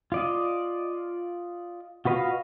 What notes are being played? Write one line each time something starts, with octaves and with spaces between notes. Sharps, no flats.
F4 D5 D#5
F4 F#4 B4 D#5 F5